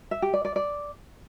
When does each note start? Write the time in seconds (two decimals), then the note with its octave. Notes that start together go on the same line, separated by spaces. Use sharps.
0.11 E5
0.22 G4
0.34 D5
0.45 D5
0.56 D5